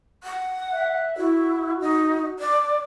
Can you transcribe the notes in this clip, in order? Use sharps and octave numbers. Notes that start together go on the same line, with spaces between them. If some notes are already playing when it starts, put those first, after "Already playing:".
F#5
E5 F#6
E4 F#4
D#4
D5